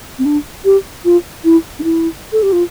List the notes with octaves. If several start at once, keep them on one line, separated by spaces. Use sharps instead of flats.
C4
D4
G4
F4
E4
D4
E4
A4
G4
F4